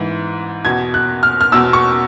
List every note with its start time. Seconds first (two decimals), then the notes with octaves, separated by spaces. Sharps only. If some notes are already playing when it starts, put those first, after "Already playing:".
Already playing: G#2 E3
0.65 E2 B2 G#6
0.94 F#6
1.23 F6
1.41 F6
1.52 E2 B2 E6
1.73 C#6